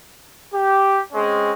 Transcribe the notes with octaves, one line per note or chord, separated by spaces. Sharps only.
G4
G#3 C4 C#4